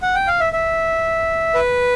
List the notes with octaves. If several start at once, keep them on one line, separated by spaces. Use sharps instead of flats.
F#5
G5
F5
E5
E5
B4